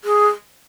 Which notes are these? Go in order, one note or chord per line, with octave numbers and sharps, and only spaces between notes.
G#4